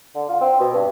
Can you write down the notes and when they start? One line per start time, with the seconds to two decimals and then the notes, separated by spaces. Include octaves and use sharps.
0.15 D3
0.29 F4
0.41 C4
0.60 B2
0.75 G2